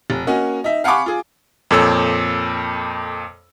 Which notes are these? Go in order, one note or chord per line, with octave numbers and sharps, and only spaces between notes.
F1
A#3 C#4 F#4 D#5
D#4 E5
F5 F#5 G#5 B5 C#6 D6
F4 G#4
F2 A#2 A4 C#5 E6